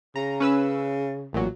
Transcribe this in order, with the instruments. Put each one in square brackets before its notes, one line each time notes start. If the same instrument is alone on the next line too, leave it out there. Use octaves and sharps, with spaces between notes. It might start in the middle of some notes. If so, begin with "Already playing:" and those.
[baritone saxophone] C#3 [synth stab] A#5
[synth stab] C#4 B4 E6
A1 A#2 F#3